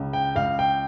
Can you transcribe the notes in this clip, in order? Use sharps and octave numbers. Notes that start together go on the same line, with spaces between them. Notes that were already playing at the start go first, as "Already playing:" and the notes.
Already playing: C#2 C#3
G5
C#2 F5
G5